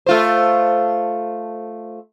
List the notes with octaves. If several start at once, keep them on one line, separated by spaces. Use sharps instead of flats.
A3 F4 C5